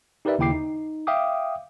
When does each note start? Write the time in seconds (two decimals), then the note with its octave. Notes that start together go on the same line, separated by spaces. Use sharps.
0.25 D#4 G4 A#4 B4 D5 E5
0.38 D#2 C#3 E4 G5 D6 C7
0.52 D#4
1.07 E5 F5 G5 D6 D#6